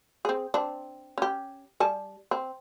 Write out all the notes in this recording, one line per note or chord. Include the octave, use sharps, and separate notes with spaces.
C4 G#4
C4 D4
C#4 G4
G3 G#5 A5
C4